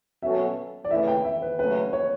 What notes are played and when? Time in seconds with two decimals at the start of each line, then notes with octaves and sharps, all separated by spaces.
0.23 B2 F#3 C#4 F#4 A4 E5
0.84 D5
0.90 C#3 E3 A3 E4 B4 E5
1.08 G5
1.25 E5
1.42 B4
1.58 C#3 F#3 A3 C#4 B4
1.93 C#5